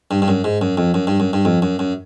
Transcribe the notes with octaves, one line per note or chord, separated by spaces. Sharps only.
G2
G2
F#2
G#2
F#2
F2
F#2
G2
F#2
G2
F2
F#2
F#2